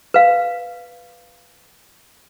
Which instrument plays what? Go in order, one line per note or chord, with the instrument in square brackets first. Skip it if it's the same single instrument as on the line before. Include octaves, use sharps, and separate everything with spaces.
[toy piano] B4 F5